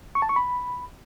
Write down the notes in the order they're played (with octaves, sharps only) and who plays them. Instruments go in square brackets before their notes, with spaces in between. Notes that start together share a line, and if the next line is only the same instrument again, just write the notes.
[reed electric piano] C#6
A5
C#6
B5